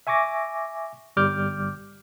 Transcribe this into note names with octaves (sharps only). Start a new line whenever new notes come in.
E5 G#5 C#6 D6 A#6
G1 G3 D6 F6 G6